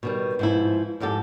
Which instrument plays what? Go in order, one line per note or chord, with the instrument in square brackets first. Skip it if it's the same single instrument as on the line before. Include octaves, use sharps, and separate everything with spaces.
[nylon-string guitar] B2 D#3 G3
G#2 F3 E4
F2 G#2 G4 A4